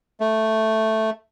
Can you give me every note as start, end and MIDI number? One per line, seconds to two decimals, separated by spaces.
0.20 1.10 57